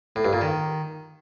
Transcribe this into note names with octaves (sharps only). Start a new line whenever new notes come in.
A2
G2
A#2
D#3